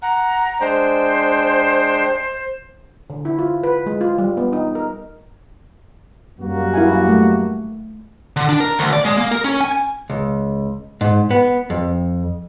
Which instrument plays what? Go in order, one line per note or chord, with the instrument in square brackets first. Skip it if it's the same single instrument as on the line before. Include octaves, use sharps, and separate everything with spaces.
[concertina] F#5 [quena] A#5
[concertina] G#3 D4 G5 [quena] C5
[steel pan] D3
E4
F4
B4
G#3
F4
G3
B3
D#4
A#4
[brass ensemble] F#2 G3 A#3 [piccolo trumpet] F#4
[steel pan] E4 F5 G#5
A3
[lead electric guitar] D3
D4
A#4
D2
D5
G#3
A#3
A#4
C#4
G#5
[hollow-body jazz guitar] C#2
G#2
B3
F2